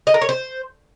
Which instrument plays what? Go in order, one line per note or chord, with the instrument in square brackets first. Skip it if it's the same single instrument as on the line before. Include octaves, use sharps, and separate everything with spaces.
[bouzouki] D#5
A#4
C#5
C5